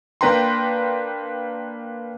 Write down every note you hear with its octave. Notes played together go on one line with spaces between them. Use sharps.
A#3 D4 B4 G5 A#5 C6